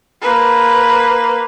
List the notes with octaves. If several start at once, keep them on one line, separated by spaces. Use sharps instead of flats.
A#3 B4